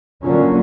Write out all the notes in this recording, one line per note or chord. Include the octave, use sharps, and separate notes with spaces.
D3 F#3 A#3 C#4 F4